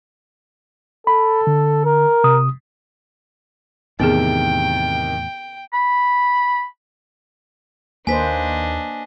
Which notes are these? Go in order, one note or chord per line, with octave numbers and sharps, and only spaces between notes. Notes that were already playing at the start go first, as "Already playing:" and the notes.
A4 B5
D3
A#4
C3 D#6
E2 A2 C3 D#3 B3 G#4 G5
B5
D#2 A#3 D4 B4 C5 D#5 G#5 B6